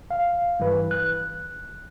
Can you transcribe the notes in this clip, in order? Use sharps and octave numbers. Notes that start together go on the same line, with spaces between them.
F5
G2 E3 B4
F#6